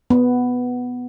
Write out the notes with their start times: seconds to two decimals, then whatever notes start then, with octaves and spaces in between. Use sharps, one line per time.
0.10 B3